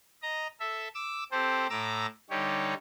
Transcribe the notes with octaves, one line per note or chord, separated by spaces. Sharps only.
D#5 A#5
A4 E5
D6 E6
C4 G4 A4 C5
A2 A#5 D6 E6
D3 G3 D#4 G4 C#5